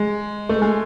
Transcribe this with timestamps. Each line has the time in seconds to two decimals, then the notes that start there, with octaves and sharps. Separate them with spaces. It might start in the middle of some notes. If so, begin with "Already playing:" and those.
Already playing: G#3
0.49 A3
0.62 G#3